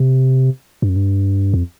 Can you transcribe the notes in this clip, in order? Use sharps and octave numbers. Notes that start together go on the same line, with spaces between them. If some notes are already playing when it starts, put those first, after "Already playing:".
Already playing: C3
G2
F#2
G2
F2